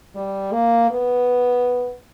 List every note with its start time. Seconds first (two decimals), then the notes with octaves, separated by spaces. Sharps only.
0.15 G3
0.52 A#3
0.91 B3